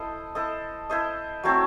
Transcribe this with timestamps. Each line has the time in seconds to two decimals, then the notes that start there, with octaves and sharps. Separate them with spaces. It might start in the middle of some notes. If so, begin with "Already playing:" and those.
Already playing: E4 A4 C5 D#5
0.35 E4 A4 C5 D#5
0.90 E4 A4 C5 D#5
1.43 F#3 A3 C4 E4